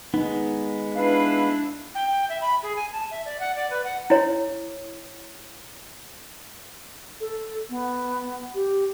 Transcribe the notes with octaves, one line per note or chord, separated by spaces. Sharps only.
G#3 B3 D#4
D4 E4 B4 F5
G5
E5
B5
G#4
G#5
A5
E5
D5
F#5
D5
B4
F#5
E4 C#5
A4
B3
G4